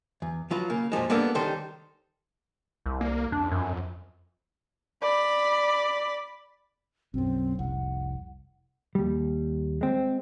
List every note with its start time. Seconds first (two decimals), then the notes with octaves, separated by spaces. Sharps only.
0.22 E2
0.51 F3 F#3 F4 B4
0.70 C#3 A#3
0.92 F2 A#2 F3 G#3
1.10 G3 A#3 B3 D4 A4 A#4
1.35 C#2 D#3 G3 A4 C5
2.86 C2
3.01 A#3
3.32 F2 D4
3.51 F#2
5.02 D5 B5
7.14 B1 F#2 C4
7.59 F1 C2 F#5
8.95 D#2 G3
9.81 G#3 C4